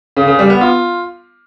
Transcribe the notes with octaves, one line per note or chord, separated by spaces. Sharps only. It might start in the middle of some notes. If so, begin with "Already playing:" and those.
C#3
C#3
G3
B3
F4